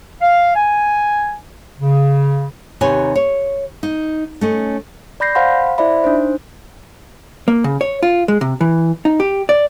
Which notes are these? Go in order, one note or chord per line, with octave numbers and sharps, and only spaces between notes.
F5
G#5
C#3
D#2 C3 D#4 B4 C#5 G#5
C#5
D#4
A3 C#4 D#5
D5 B5 G6 A#6 C7
C5 F5 F#5 G#5 B5 C6
E4 C5 D5 E5 B5
D4 D#4 C5
A#3
C#3
C#5
F4
G#3
C3
E3
D#4
G4
D5